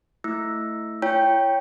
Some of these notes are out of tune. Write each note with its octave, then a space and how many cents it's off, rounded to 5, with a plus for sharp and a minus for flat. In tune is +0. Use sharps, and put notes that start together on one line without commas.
A3 +5 E4 +0 E6 +0
E4 +35 C#5 +0 G5 +0